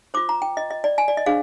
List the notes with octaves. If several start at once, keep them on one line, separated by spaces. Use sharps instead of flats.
F4 C5 D6
A#5
G5
D#5
D#5
D5
G#5
D5
D#5
D4 G#4 C5 F5